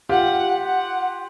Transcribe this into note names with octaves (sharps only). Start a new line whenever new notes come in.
F4 G4 F#5
F#5